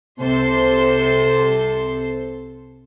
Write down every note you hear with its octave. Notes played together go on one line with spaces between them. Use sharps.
C2 C3 A4 C5 C6